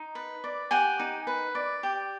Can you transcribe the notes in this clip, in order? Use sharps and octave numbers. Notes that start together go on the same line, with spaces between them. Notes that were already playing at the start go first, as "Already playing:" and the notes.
Already playing: D#4
B4
D5
G4 F#5 G#5
D#4
B4
D5
G4